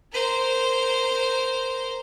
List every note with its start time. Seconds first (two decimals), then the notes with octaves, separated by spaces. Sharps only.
0.12 A#4 C5